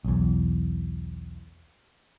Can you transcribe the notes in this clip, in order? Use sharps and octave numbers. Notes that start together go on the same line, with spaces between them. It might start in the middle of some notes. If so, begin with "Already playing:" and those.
B1 E2